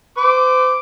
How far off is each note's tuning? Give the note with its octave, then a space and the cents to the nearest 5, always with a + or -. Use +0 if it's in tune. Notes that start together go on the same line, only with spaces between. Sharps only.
C5 -40 D6 +0